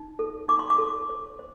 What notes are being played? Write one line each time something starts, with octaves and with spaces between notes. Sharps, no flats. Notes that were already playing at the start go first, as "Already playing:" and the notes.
Already playing: D#4
A4
D#4 D6
C6
D6
A4
C5
C5